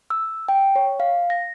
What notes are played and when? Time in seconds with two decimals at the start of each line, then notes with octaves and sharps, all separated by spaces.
0.10 E6
0.48 G5
0.76 C#5
1.00 F5
1.30 A#6